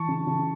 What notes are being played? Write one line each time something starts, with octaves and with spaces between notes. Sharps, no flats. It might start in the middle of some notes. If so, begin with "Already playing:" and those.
Already playing: E3 A5 C#6
C#3
C#3